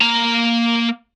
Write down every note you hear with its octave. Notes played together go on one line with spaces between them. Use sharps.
A#3 A#5